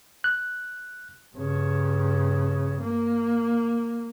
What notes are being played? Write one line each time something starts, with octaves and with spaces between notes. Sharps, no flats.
F#6
G2 C#3
A#3